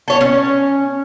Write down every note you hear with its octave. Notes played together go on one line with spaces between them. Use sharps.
A4 C#5
C#4